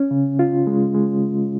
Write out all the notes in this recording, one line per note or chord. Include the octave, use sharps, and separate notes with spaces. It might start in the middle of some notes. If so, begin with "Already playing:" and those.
Already playing: C#4
C#3
F4
G#3
G#3